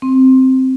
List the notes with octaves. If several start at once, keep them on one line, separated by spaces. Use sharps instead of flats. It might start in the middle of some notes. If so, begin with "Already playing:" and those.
C4